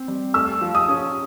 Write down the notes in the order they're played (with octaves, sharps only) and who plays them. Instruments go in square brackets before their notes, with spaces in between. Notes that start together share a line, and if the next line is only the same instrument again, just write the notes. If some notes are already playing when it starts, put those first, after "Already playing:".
Already playing: [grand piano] C4
G3
[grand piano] A3 [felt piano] E6
[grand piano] F3
[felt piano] D#6
[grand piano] C#4